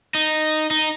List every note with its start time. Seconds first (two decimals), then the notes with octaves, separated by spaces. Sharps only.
0.15 D#4
0.71 D#4